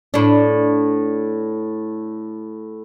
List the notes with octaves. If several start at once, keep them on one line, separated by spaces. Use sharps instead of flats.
A2 D4